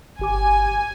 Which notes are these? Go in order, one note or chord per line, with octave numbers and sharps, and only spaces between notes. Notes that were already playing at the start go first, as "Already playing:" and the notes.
G1 G4 G#5 D6